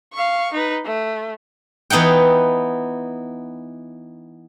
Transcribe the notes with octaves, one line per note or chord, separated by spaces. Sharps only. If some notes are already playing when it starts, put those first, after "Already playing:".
F5 C#6
D#4 B4
A3
E3 B3 D#4 F#5 G5